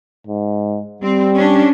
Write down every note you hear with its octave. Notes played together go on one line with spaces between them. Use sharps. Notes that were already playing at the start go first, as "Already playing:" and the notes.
G#2
G3 C4
C#4 D4